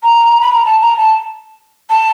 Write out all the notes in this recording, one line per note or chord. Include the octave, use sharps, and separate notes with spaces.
A#5
B5
A#5
A5
A#5
A5
A5